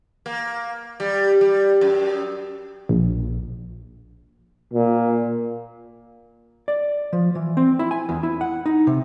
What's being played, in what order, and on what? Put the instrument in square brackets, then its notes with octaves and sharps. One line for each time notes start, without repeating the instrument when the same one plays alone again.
[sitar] A#3
G3
G3
F#2
[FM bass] A#1
[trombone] A#2
[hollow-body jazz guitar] D5
F3
E3
C4
E4
G#5
E2
E4
F#5
D#4
C3